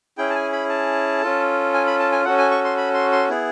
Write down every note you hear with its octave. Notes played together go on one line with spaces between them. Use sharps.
C#4 E4 G#4 G5
A5
G#5
B5
A5
C#4 F4 A4
G#5
B5
A5
G#5
C#4 F#4 A4 F#5
G#5
C#6
C6
B5
C6
C6
B3 E4 G#4